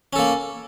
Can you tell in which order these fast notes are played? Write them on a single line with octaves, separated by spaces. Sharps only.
C#4 A4 A#3